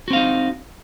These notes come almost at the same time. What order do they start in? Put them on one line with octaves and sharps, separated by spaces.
F#4 C4 F5 D#4